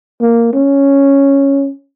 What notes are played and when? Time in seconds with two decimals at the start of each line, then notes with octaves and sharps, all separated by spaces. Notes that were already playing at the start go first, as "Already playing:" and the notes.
0.22 A#3
0.54 C#4